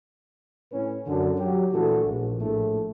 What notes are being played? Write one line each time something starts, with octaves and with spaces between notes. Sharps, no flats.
A2 C#4 B4
F#2 D3
F#3 G4
A#2 E3 A3 D4 F#4 A4
A#1
A#1 A2 A3